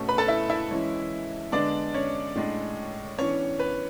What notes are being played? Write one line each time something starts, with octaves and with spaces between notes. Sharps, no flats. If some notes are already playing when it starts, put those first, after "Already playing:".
Already playing: B2 A3 C#4
B4 B5
A4 A5
E4 E5
E4 E5
E3 G#3 C#4
D3 G#3 B3 D4 D5
C#4 C#5
A2 G#3 D4
E3 B3 C#4 D4 C#5
B4